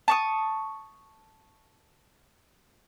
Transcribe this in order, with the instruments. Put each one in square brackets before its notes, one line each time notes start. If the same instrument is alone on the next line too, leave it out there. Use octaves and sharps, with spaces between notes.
[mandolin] A5 C#6 D#6